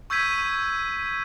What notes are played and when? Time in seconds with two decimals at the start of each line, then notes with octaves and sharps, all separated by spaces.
0.10 C#6 E6 G6 G#6 B6 D#7